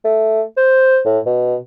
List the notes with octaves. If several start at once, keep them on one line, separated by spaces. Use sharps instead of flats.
A3
C5
A2
B2